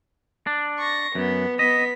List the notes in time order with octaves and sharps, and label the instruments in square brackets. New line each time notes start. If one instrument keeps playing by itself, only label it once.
[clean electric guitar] D4
[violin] C#6 A#6
[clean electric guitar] F#2 [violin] B3
[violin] B3 B6 [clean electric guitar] D#5